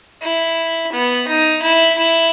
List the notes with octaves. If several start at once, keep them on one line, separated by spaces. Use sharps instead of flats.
E4
B3
D#4
E4
E4